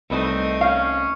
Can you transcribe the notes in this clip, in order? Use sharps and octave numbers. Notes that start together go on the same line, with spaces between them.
C2 A3 C4 D#4 B4 D#5
C#4 F5